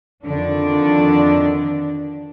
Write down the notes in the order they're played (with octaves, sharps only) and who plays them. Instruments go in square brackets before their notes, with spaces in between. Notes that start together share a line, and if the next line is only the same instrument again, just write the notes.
[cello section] F2 D3 D#3 D4